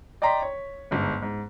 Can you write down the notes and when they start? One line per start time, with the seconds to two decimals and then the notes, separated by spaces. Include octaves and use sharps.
0.22 D5 D#5 G5 A#5 C6 B6
0.42 C#5
0.91 G1 G#2
1.22 G#2